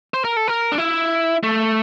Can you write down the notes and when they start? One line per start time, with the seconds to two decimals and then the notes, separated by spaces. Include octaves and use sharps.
0.14 C5
0.24 A#4
0.37 A4
0.47 A#4
0.72 D4
0.78 E4
1.43 A3